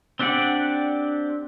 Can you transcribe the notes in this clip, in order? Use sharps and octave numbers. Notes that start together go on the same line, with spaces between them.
C4 D4 G4 D5 F#5